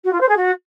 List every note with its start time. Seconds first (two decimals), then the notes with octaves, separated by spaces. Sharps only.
0.04 F#4
0.12 F4
0.20 C5
0.28 G#4
0.36 F#4